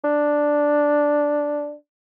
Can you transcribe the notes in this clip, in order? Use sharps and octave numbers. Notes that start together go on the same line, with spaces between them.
D4